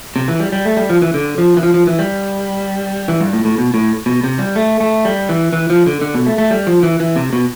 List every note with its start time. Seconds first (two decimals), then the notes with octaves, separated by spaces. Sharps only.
0.16 C3
0.28 E3
0.40 G3
0.52 G3
0.65 A3
0.77 G3
0.90 F3
1.02 E3
1.14 D3
1.38 F3
1.57 E3
1.63 F3
1.74 F3
1.87 E3
1.99 G3
3.08 E3
3.21 G2
3.33 A2
3.45 A2
3.58 B2
3.74 A2
4.06 B2
4.24 C3
4.39 G3
4.56 A3
4.80 A3
5.05 G3
5.29 E3
5.53 E3
5.70 F3
5.86 D3
6.01 D3
6.14 B2
6.26 A3
6.38 A3
6.51 G3
6.67 F3
6.83 E3
7.00 E3
7.16 C3
7.33 B2